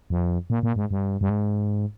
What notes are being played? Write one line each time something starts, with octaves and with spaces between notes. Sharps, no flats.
F2
A#2
A#2
G#2
G2
G2
G#2